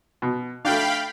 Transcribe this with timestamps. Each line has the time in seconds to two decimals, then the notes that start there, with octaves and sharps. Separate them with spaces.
0.22 B2
0.65 A3 D4 F5 G5 B5